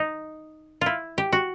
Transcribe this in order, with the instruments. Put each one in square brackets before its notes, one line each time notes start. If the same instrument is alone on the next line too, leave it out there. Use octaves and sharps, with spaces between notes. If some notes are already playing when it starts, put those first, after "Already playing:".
Already playing: [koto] D#4
E4 F4
G4
F#4